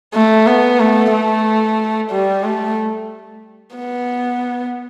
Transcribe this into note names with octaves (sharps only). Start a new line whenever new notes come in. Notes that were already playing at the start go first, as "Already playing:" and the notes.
A3
B3
A3
A3
G3
A3
B3